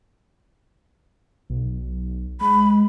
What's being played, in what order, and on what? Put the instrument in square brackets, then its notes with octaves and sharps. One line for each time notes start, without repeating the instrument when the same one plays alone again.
[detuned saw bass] B1
[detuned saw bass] G#3 [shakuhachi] B5